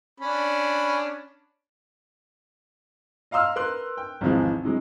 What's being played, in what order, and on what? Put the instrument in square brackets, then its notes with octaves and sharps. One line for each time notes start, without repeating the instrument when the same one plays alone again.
[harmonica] C#4 D4 B5
[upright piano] D#5 F5 A#5 C6 E6 F6
A#4 B4 C6 F#6
G5
G#1 E2 C3 E3 F3 G#3
C3 E3 F#3 G#3